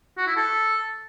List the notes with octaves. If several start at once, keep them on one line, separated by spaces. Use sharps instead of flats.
F#4
E4
A4